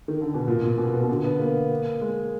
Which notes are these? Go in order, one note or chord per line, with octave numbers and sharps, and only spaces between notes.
D#3
D3
B2
A#2
A#2
B2
B2
B2
D3
B3
A#3
G#3